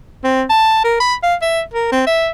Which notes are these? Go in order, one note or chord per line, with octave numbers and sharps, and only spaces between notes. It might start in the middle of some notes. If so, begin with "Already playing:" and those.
C4
A5
A#4
B5
F5
E5
A#4
C4
E5